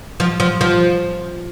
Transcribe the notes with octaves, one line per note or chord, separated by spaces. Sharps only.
F3
F3
F3